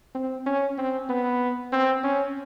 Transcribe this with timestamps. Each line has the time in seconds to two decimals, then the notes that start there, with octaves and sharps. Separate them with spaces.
0.15 C4
0.46 C#4
0.78 C4
1.09 B3
1.72 C4
2.03 C#4